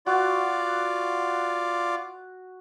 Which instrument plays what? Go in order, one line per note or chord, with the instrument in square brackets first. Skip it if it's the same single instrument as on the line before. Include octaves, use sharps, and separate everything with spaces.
[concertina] F4 D5 [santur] F#4